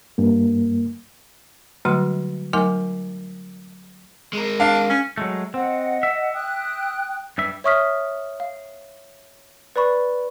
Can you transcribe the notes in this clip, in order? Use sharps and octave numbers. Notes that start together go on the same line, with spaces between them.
G2 A#3
D3 F#3 G3 A3 F#4 C6
F#3 A3 D#4 A#4 G#5 D6
G#3 A#4
D4 F5
C#4
F#3 G#3 A3
C4 D#5 F#5
E5
G5 D#6 F#6
G2 G3 E5
C#5 E5 C#6 D#6 F6 B6
F5
B4 D5 B5 C#6